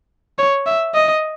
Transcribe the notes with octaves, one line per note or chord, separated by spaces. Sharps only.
C#5
E5
D#5